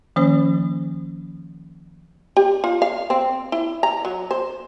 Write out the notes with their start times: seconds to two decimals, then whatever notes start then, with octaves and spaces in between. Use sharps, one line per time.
0.16 D#3 F3 A#3 C#4 C5
2.37 G4
2.64 F4
2.82 F5
3.10 C4
3.52 E4
3.83 A#5
4.05 F#3
4.31 C5